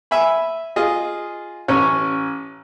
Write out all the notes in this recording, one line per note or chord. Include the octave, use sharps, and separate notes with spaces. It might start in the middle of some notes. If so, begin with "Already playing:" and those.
E5 G#5 B5
F4 G#4 D#5
A1 C#4 C#5